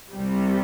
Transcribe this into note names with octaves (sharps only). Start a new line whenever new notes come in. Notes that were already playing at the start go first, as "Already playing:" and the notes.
C2 C3 G3